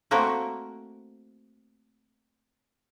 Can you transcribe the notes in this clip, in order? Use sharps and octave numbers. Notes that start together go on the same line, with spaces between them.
A3 A#3 C4 F#4 A#4